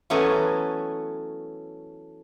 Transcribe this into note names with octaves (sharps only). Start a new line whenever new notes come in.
E3 F#3 A3 B3 C#4